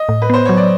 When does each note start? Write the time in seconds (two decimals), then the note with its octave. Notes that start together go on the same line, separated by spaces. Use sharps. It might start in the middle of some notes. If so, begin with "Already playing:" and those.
Already playing: D#5
0.09 A2
0.22 B4
0.30 B3 C5
0.45 F#3 C#5
0.57 D5